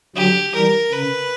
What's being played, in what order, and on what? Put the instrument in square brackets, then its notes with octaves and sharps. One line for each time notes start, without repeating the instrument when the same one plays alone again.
[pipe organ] D3 F#3 [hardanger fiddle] G4
[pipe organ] E3 G3 [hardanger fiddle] A#4
[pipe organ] C#3 [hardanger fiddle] B4